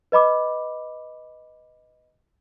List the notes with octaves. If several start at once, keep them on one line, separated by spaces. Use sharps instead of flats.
B4 D#5 B5 D6